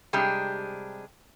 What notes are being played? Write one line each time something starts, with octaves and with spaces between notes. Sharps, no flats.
C3 G3 G#3 D4 G4